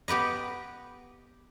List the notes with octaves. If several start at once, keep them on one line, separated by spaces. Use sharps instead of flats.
B3 G4 B4 D#5